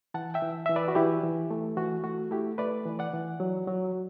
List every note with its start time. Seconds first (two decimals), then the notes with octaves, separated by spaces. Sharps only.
0.14 E3 F#5 A5
0.34 E5 G5
0.42 E3
0.66 E3 E5
0.76 B4 D5
0.88 F#4
0.95 E3 E4 G4
1.23 E3
1.51 A3
1.77 E3 F#4
2.04 A3 F#4
2.31 A3 E4 G4
2.58 A3 B4 D5
2.85 E3
2.99 D5 F#5
3.13 E3
3.40 F#3
3.67 F#3